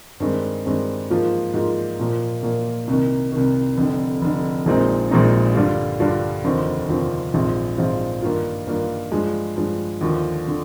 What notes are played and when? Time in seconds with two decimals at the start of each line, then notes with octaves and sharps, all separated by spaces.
0.20 G2 D#3 G#3 C4
0.66 G2 D#3 G#3 C4
1.10 G#2 F3 A#3 F4
1.54 G#2 F3 A#3 F4
1.99 A#2 F3 A#3
2.43 A#2 F3 A#3
2.87 C2 C3 D#3
3.32 C2 C3 D#3
3.77 F1 F2 D3
4.22 F1 F2 D3
4.66 A#1 A#2 G#3 C4 D#4
5.11 A#1 A#2 G#3 C4 D#4
5.55 G2 D3 G3 D4 F4
6.00 G2 D3 G3 D4 F4
6.44 F1 D#2 D3 F3 C4
6.89 F1 D#2 D3 F3 C4
7.34 A#1 G#2 F3 C4 F4
7.77 A#1 G#2 F3 C4 F4
8.22 G2 D#3 A#3 F4
8.67 G2 D#3 A#3 F4
9.12 G2 F3 G#3
9.56 G2 F3 G#3
10.01 D#2 D3 F3
10.48 D3